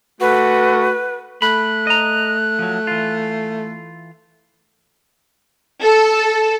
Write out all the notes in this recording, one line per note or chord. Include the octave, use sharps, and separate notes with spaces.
A3 F#4 B4
A3 B5 F#6
D#5 A#5
F3 F#3
E3 F4
A4